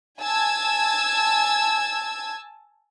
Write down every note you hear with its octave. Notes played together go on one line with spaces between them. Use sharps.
G#5 A5 E6 G#6